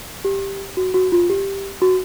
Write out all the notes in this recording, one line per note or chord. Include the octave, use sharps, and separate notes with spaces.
G4
F#4
F#4
F4
G4
F#4